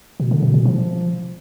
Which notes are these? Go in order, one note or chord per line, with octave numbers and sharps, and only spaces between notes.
B2
D3
B2
B2
F3